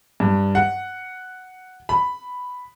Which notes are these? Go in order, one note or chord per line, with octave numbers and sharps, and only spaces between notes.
G2
F#5
B5